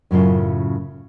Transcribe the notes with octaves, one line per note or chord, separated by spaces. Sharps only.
F#2 A2 C#3 F4